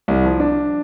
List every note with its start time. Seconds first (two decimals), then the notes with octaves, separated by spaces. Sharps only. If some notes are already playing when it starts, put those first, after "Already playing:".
0.08 C2
0.24 F3
0.40 D4